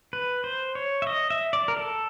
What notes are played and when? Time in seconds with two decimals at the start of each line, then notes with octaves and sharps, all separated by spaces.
0.13 B4
0.44 C5
0.75 C#5
1.02 E5
1.07 D#5
1.30 E5
1.53 D5
1.68 A#4
1.77 A4